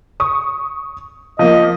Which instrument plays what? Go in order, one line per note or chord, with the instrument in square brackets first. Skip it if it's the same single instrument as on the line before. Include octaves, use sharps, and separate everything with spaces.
[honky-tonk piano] C#6 D#6
[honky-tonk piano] F3 A#3 [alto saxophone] D#5